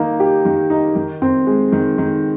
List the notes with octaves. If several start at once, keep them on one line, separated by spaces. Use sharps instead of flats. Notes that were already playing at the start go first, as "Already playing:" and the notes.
Already playing: D#3 A#3 D#4
G4
D#3
D#4
D#3
C4
G#3
D#3
D#3